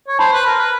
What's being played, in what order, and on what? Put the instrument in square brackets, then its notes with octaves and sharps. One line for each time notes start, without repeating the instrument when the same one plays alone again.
[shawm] C#5
[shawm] C5 [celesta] A5 B5
[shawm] B4
A#4
B4